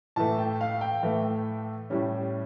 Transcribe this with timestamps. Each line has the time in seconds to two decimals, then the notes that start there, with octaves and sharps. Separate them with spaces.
0.16 A2 E3 A3 A5
0.38 G5
0.61 F5
0.81 G5
1.03 A2 E3 A3
1.90 A2 G3 C#4